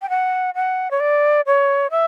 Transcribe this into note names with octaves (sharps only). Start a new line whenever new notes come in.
G5
F#5
F#5
C#5
D5
C#5
E5